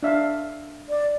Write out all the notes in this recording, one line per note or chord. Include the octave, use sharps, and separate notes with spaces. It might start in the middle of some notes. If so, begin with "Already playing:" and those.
D4 E5 F5
D5